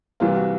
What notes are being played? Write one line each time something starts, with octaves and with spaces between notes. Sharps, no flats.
C2 C3 E3 G3 A#3 F4
F#4